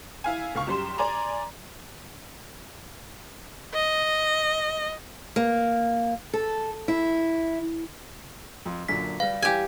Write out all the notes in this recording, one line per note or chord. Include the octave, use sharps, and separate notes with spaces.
E4 F5 G#5
C#2 F5 C#6
F#2 G3 C6 E7
D5 G#5 A#5 C6
D#5
A#3
A4
E4
F2
F#2 A#2 D3 B6
G3 B4 F5
E3 G3 G4 G#5